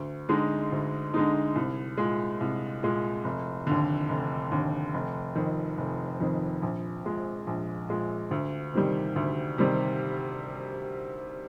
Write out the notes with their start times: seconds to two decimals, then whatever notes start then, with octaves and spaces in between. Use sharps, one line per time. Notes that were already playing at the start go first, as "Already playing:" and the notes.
Already playing: D2
0.29 D3 G#3 D#4
0.72 D2
1.14 D3 G#3 D#4
1.55 C2
1.97 A#2 G#3
2.41 C2
2.83 A#2 G#3
3.24 F1
3.67 D#2 D3
4.09 F1
4.52 D#2 D3
4.94 F1
5.36 F2 D#3
5.78 F1
6.20 F2 D#3
6.62 A#1
7.04 A#2 G#3
7.47 A#1
7.89 A#2 G#3
8.31 D2
8.74 C3 D#3 G3
9.16 D2
9.58 C3 D#3 G3